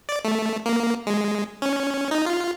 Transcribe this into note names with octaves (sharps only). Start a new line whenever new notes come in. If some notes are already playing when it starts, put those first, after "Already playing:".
D5
A3
A#3
G#3
C#4
D#4
F4